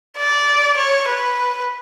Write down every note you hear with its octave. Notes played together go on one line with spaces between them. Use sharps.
D5
C#5
B4